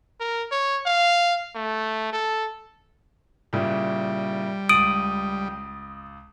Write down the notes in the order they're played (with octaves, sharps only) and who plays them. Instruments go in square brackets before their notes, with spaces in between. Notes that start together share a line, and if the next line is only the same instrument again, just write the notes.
[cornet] A#4
C#5
F5
A3
A4
[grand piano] A#2 C#3 E4 [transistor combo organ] G3
[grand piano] C#2 A6 F#7 [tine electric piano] D#6 [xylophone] D7